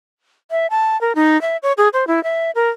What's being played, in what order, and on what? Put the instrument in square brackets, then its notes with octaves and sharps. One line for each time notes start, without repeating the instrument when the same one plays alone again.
[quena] E5
A5
A#4
D#4
E5
C#5
G#4
C5
E4
E5
A#4